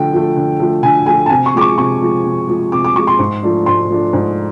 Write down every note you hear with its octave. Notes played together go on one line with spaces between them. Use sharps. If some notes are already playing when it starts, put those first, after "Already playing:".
Already playing: D3 F3 A3 G5
F3 A3
D3
F3 A3
D3 G#5
F3 A3 G#5
A5
C3 G#5
C#6
F3 G#3 D6
C#6
C3 C#6
F3 G#3
C3
F3 G#3
C3 D6
D6
F3 G#3 C#6
C6
G#2
F3 A3 D4
G#2 C6
F3 A3 D4
G#2